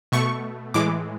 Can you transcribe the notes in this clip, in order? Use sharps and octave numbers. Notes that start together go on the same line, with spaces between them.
B2 A3 C#6
A2 E3 G#3 D6